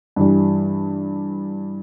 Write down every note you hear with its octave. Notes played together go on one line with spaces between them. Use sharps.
G2 E3 G3